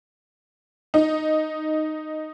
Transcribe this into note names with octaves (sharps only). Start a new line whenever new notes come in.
D#4